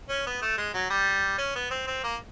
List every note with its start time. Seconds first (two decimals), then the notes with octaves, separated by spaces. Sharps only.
0.09 C#4
0.26 B3
0.42 A3
0.58 G#3
0.74 F#3
0.90 G3
1.38 C#4
1.55 B3
1.71 C4
1.87 C4
2.04 A#3